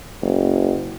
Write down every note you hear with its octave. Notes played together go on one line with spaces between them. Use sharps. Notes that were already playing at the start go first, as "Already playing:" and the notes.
F#1